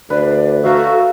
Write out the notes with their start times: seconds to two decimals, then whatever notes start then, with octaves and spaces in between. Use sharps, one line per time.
0.10 D2 B4 D5
0.63 F#4 A4 E5 F5 A#5